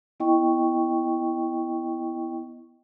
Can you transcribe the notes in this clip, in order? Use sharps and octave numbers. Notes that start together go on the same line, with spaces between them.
B3 E4 D#5 G5 C#6